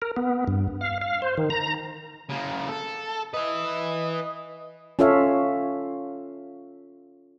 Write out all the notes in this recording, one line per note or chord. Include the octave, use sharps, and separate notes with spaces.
A#4
B3
G2
F5
F5
C5
D#3
A#5
C#3 A#3
A4
B4 D#5 E5
C#4 F4 A4 C#5 E5 F5